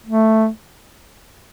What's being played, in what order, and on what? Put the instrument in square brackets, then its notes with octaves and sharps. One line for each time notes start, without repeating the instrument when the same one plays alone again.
[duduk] A3